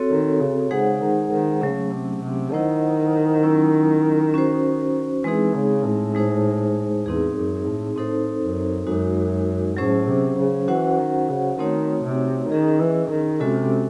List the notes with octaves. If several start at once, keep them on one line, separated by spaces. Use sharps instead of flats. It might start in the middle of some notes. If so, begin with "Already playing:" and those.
Already playing: C4 F#4 A4 C#5
D#3
C#3
C#3 G#3 D#4 G#4 C5 F#5
D#3
D#3
C#3 F#3 A3 C#4
C3
C3
D#3 E4 C5 D#5 F#5
F#3 C#4 E4
C#4 F#4 C5
E3 G#3 C4 D#4 G#4
C#3
A2
G#3 D#4 G#4 C5
E2 C4 D#4 G#4
F#2
A2
A2 C4 D#4 A4 C5
F#2
F#2 G#3 D#4 F#4
A2 F#3 C#4 G#4 C5
C3
C#3
E3 C#4 F#4 C5 F#5
D#3
C#3
D#3 A3 C4 D#4 F#4 C#5
C3
D#3 C#4 G#4 D#5
E3
D#3
C3 G#3 C#4 F#4 A4